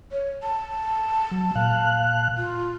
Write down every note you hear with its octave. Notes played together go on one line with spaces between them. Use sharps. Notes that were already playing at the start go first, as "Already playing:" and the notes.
C#5
A5
F#3
A#2 F5 F#6
F4